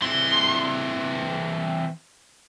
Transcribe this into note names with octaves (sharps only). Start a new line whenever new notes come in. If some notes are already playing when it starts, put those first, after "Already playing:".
E3 C4 C6